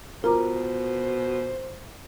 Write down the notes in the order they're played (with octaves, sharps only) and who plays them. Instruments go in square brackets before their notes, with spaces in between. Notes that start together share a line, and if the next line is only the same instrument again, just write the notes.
[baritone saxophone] B2 [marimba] F4 A#5 D6 [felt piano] A#4 [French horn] C5